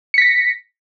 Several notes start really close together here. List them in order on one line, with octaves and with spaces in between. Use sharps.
C#7 B6 A#6